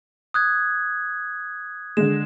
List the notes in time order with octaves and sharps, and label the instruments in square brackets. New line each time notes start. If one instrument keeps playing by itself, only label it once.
[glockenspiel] D#6 F#6 G#6
[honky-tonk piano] D3 G#3 [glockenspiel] E7